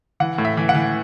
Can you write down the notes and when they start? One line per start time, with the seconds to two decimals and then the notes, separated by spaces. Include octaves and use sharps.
0.20 E3 F#5
0.38 A2
0.45 E5
0.57 E3
0.69 F#5
0.75 E3